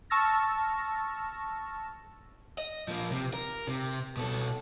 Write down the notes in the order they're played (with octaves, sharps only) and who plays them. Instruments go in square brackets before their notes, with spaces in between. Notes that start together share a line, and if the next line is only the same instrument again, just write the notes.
[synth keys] A5 C#6 E6 F6 A6 A#6
[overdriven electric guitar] D#5
F3 A#3
C3
A#4
C3
B2 A4